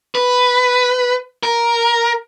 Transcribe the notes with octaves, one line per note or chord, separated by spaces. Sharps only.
B4
A#4